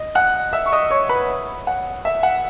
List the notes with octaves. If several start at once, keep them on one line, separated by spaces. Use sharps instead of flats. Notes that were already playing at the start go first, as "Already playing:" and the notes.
Already playing: D#5
F#5 F#6
E5 E6
C#6
D#5 D#6
C#5 C#6
B4 B5
F#5
E5
F#5